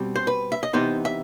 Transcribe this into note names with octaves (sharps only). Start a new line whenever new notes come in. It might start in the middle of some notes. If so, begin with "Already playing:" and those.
Already playing: B2 G3 C4
C5
B4
E5
D#5
C3 E3 B3 D#4 C5
E5